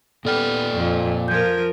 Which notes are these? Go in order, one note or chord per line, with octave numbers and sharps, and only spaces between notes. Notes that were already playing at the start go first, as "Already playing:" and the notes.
A#2 B3 A4 D5 G5 F6
F2
F3 F4 A#4 G6 G#6